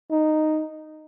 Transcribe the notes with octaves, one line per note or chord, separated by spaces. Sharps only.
D#4